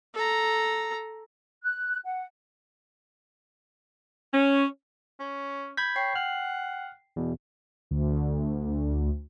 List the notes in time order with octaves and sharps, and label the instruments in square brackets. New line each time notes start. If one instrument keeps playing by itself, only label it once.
[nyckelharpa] A4 A#5
[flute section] F#6
F#5
[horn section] C#4
[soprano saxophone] C#4
[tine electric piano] B5 G#6 B6 [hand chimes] G6
[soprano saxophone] C#5 [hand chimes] G5 C7
[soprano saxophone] F#5 [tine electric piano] F6
[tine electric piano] E2 B2
[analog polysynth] D2